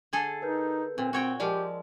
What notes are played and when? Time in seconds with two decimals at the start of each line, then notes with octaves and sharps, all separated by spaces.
0.13 D3 G#4 A4
0.42 D#4 A#4 B4 G6
0.98 A#2 C4
1.13 C4 F#4 C#5 G5
1.40 F3 G#3 G4 A#4 D5 F5